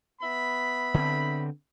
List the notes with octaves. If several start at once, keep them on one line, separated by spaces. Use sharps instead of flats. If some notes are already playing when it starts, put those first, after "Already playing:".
B3 E5 B5
D3 C4